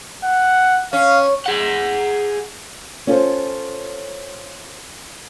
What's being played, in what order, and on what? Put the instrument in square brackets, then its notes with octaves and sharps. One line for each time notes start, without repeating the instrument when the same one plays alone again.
[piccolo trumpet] F#5
[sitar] C#4 [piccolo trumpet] F5
[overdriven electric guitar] G#4 F#5
[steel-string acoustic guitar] C#4 F4 A4 C5